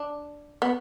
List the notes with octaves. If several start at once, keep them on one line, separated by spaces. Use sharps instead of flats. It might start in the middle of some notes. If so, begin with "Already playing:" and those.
Already playing: D4
B3